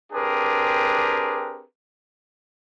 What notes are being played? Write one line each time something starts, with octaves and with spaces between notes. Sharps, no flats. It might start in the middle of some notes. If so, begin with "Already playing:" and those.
C4 D4 G4 G#4 A#4 B4